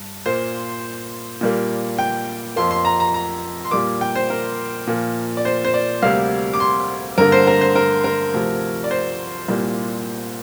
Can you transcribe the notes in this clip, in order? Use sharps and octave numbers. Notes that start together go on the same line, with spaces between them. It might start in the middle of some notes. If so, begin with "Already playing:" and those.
Already playing: G2
A#2 A#3 C5
A#2 G3 A#3
G5
F2 F3 A#3 C6
C6
A#5
A#5
A#5
C6
A#2 G3 A#3 D6
G5
C5
A#4
A#2 F3 A#3
D5
C5
C5
D5
D2 C3 G3 A#3 F5
D6
C6
G2 D3 A#3 A#4
C5
A#4
C5
A#4
A#4
D2 C3 F3
D5
C5
C2 A#2 G3 A#3